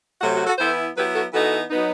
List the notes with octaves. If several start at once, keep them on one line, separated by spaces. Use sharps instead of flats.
C3 F#3 A3 F#4
F#4
F#4 A4
E3 B3 E4 A4 C5
F#3 B3 E4 G4 B4
F#4 A4
E3 B3 D#4 F#4 A4
F#3 B3 D#4